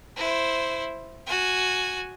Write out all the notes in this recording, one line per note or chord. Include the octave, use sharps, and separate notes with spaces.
E4 C5
F#4 G#5